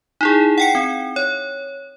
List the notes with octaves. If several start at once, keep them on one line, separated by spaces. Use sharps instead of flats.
D#4 E4 G#4
F#5 G5 C#7
C4
C#5